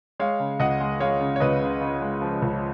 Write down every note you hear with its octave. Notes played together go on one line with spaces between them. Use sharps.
G#3 C#5 F5
C#3
C#2 D#5 F#5
G#3
G#3 C#5 F5
C#3
C#5
C#2 B4 D#5
C#3
C#3
G#3
F3
C#2